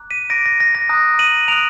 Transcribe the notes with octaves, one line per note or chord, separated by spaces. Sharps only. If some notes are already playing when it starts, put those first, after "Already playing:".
Already playing: A#5 D6 F#6
B6 D#7
A#5 D6 F#6 A#6 D7
A#6
A#6
A#6
A#5 D#6 F#6
D#7 F#7
A#5 D#6 F#6 D7 F7